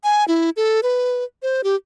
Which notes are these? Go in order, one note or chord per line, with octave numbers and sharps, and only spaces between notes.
G#5
E4
A4
B4
C5
G4